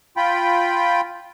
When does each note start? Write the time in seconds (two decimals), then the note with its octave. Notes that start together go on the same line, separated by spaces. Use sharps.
0.17 F4 G5 B5